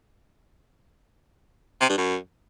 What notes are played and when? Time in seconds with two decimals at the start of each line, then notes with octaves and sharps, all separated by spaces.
1.81 C3
1.89 G2
1.98 F#2